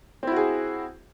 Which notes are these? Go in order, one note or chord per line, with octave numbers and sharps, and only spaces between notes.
C4 E4 F#4 G#4